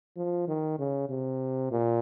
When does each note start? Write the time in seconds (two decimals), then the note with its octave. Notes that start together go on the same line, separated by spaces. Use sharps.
0.17 F3
0.48 D#3
0.79 C#3
1.09 C3
1.71 A#2